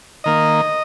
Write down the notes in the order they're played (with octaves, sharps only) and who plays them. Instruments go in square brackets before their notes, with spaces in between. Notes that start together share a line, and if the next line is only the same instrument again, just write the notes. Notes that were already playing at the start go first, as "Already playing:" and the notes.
[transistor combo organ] D#3 A#3 D#5